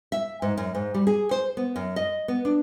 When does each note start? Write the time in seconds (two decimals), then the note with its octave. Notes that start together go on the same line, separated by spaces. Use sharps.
0.12 E5
0.42 G#2
0.57 F#2
0.75 G#2
0.94 G3
1.07 G#4
1.31 C5
1.57 B3
1.76 F#2
1.96 D#5
2.28 B3
2.45 D4